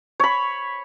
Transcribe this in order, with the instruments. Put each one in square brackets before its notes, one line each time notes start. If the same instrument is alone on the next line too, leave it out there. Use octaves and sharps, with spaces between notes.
[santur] C#5 B5